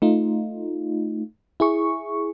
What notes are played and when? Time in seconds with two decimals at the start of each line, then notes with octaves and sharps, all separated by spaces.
0.02 A3 D#4 F4
1.60 E4 G#4 C#6